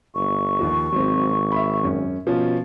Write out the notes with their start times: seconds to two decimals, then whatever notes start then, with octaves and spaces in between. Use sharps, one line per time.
0.15 G1 C#6
0.60 D#2 F3
0.92 G#1 F#3 C4
1.52 E5 B5
1.84 F#2 C#4
2.27 B2 F3 C#4 F4